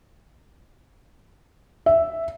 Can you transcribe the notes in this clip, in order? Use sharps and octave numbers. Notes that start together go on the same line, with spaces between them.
E5